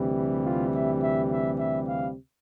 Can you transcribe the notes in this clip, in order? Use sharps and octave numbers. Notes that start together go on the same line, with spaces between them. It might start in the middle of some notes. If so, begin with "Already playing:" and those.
Already playing: D2 C3 E3 G3
F4
E5
E5
E5
E5
F5